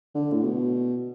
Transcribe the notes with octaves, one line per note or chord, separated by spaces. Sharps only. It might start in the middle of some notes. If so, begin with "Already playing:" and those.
D3
A2
B2